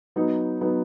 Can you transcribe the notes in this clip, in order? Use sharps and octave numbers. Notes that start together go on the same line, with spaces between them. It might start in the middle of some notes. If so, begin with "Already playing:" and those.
F#3 B3 D#4
F#3 B3 D#4